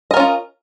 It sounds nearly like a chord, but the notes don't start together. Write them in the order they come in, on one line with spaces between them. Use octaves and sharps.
D#5 A#4 C#4 F4